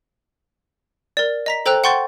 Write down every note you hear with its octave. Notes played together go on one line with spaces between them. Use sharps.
A#4 D5
D#5 A#5 B6
A4 C5 G5 A#5 E6 F#6
F#5 G5 C6 C#6 G6 A6